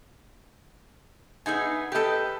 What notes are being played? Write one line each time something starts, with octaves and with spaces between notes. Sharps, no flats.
B3 D#4 G#4 E5 G#5
G4 A4 B4 D#5